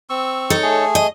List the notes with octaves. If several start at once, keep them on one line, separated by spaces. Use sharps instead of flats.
C4 C#6 E6
D#4 A4 C#5
A3 G#4
D#5